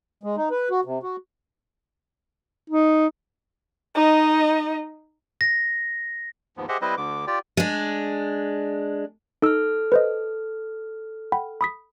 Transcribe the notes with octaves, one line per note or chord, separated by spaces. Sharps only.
G#3
D#4
B4
F#4
C3
F#4
D#4
D#4 D#5
A#6
D#2 G#2 F3 B3
G4 G#4 C5 D#5 E5 F#5
G3 C4 E4 B4 C5 D#5
D2 D3 D6
F4 G4 D5 G5
G#3 D4
D#4 A4 E6 F6
B4 C5 D#5
F#5 G5 B5
B5 D#6 B6